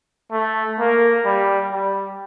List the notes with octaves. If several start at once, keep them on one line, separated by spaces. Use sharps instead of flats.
A3
A#3
G3
G3